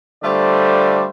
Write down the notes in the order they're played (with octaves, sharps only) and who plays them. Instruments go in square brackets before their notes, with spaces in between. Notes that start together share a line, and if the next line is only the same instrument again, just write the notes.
[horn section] D3 G3 A3 F4 C5 D5